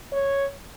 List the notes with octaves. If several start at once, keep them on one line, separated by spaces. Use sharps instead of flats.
C#5